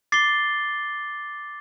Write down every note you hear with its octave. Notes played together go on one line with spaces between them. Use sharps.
D6 A6 C7 G7